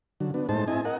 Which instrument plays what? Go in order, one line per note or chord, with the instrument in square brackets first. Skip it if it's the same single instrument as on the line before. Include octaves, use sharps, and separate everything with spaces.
[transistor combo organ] D3 F#3
B3 D4
A2 G#3 D#4 C5 A5
C4 E4 D#5 G#5
A#4 D#5 F#5